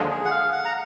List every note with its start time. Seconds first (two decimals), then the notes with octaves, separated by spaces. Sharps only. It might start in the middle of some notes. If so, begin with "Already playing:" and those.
Already playing: D#2 D3 F3 G#3
0.10 G#4
0.25 F#5
0.31 F5
0.52 F#5
0.65 A#5